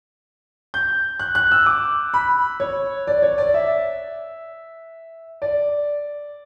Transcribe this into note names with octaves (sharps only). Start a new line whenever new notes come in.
G6
F#6
F#6
E6
D6
B5
C#5
D5
C#5
D5
E5
D5